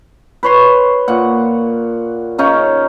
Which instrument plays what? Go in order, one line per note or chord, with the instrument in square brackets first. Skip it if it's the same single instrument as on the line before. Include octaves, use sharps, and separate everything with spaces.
[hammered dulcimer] B4 C#5 C6
A#2 F#5
C#3 C#4 D#4